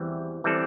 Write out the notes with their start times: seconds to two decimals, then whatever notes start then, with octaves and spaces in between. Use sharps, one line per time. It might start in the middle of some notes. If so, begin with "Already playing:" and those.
Already playing: E2 E3 G3 C4
0.44 E3 G3 C4 A4